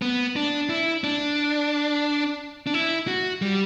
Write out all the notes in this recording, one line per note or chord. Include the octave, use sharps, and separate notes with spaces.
B3
D4
E4
D4
D4
E4
F#4
G3